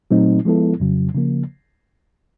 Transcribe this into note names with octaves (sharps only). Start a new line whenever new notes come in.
A#2 F#3 A3 C4 D#4
F3 G#3 B3 E4 A4
F2 C#3 F#3
C#3 F3 A#3